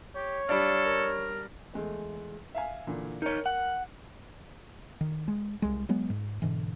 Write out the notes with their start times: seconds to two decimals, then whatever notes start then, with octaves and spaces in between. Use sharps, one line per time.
0.16 G4 C#5
0.49 G3 D4 A4 F5
0.84 A#4
1.74 E2 G#3 A3
2.55 E5 F5 G#5
2.87 A#2 D3 E3
3.22 D#4 A#4 C#5
3.46 F#5
5.01 D#3
5.28 G#3
5.62 C2 G#3
5.89 F#3 G#3 B3
6.10 G#2
6.42 G#2 B2 D3 E3